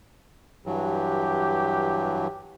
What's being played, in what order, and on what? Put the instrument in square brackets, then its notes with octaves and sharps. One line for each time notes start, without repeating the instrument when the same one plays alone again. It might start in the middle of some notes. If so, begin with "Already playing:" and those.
[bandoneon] G2 E3 F#3 [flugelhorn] G4